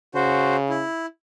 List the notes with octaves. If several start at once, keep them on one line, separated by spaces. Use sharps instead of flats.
C#3 F#4 C5
E4